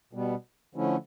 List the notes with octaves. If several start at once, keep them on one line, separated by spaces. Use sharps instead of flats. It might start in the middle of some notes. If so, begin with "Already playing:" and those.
B2 G3 B3
D3 F3 A3 C#4 E4